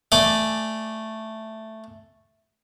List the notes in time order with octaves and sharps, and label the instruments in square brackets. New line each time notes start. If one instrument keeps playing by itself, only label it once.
[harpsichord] A3 D5 G#5